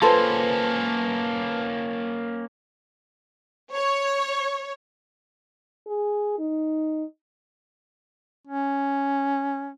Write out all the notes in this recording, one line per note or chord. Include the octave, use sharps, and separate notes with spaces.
A#3 C#4 F4 A4 B4 C5 A5
C#5
G#4
D#4
C#4